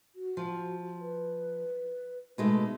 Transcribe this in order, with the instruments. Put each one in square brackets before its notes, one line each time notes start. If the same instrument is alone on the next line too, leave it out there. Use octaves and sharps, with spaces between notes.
[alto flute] F#4
[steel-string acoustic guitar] F3
[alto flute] B4
[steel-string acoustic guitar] B2 G#3 A3 [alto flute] D#4